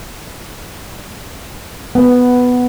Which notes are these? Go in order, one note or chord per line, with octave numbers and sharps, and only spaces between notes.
B3